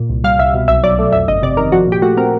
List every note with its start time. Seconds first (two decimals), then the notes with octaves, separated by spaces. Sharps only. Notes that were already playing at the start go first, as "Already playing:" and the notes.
Already playing: A#2
0.10 C2
0.24 G3 F5
0.39 C2 E5
0.53 B2
0.68 B1 E5
0.84 F#3 D5
0.99 A3
1.13 F2 E5
1.28 G1 D#5
1.42 C3 D5
1.57 D#3 A#4
1.72 F3 F#4
1.88 A#2 G4
2.02 A3 F#4
2.17 C4 A#4